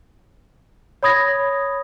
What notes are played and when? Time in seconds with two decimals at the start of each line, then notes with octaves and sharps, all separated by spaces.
1.03 C#5 B5 D#6 G#6 A#6